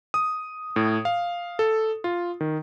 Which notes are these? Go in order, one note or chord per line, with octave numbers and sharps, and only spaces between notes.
D#6
A2
F5
A4
F4
D#3